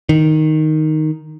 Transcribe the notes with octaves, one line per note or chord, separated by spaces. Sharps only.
D#3